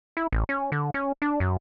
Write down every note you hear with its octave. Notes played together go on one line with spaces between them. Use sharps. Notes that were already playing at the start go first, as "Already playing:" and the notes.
E4
A1
C#4
D3
C#4
D4
F#2